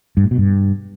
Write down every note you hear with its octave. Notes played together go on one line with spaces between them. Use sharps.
G2
A2
B2
G2